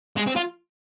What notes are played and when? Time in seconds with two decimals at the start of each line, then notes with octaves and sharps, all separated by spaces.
0.17 G#3
0.27 C4
0.36 F4